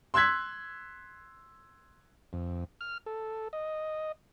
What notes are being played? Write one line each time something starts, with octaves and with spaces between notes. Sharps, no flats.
C6 E6 F#6 G#6 B6
F2
F6
A4
D#5